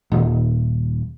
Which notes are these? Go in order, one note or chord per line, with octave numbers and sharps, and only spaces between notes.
D#1